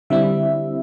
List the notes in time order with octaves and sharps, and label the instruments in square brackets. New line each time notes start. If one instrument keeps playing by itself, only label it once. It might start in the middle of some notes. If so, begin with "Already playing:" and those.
[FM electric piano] D3 G3 C4 E4 E5